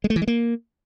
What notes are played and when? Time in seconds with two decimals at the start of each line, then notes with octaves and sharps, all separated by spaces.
0.04 G#3
0.10 A3
0.16 E3
0.22 G#3
0.28 A#3